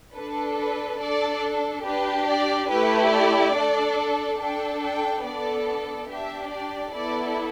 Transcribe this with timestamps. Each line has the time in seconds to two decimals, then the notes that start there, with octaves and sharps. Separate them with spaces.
0.15 D4 A4 B4
0.58 B4
1.00 D4 A4 D5
1.85 D4 G4 B4
2.28 D5
2.70 A3 E4 G4 B4
3.12 D5
3.55 D4 A4
4.40 D4 A4 G5
4.82 G5
5.25 B3 D4 A4 D5
5.67 D5
6.09 D4 G4 E5
6.52 D5
6.95 B3 E4 A4 D5